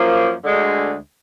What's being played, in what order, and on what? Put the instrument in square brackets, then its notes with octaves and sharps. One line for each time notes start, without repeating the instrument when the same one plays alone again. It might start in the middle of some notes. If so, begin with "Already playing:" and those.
Already playing: [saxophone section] F#2 F3 A#3
D2 D3 G#3